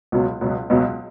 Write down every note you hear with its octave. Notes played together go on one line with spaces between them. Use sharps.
C#2 B2 F#3 B3
C#2 B2 F#3 B3
C#2 B2 F#3 B3